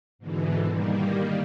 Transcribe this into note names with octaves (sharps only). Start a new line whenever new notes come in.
G#2 B2 D3 E3
D#3 G3 A#3